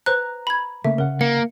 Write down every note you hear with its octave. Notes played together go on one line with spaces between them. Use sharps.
B4 C5 A#5 F#6
B5 G#6
C#3 A3 A#3 E5
C#3 A#4 F#5
A#3 C#7